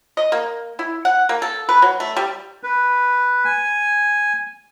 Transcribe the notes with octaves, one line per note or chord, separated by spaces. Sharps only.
D#5
A#3
E4
F#5
A#3
A4
B4
F#3
A3
G3
B4
G#5